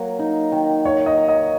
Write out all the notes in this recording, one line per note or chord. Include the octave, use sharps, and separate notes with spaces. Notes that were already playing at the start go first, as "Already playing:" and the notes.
Already playing: F#3 A#3
D#4
D#3
A#3 C#5
D#5
F#3
D#5